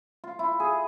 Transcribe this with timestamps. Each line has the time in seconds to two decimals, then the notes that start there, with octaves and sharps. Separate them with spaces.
0.24 F4
0.39 E4
0.60 G#4